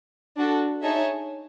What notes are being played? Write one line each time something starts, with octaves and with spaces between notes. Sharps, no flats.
D4 F#4 A4
D#4 G#4 C#5 E5 A5